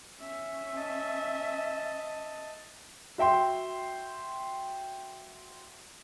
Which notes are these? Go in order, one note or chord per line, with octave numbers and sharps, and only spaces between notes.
C#4 E5
D#5 A5
F#4 E5 G5 C6